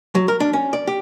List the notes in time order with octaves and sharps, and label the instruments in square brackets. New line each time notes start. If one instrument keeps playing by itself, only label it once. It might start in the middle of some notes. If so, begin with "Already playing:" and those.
[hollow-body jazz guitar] F#3
A#4
D4
C#4
D5
G4